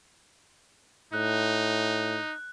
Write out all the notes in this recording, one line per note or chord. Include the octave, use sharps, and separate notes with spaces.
A2 D#4 F#6